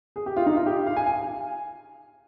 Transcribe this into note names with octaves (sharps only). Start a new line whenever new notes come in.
G#4
G4
F4
D#4
F4
G4
F5
G#5
G#5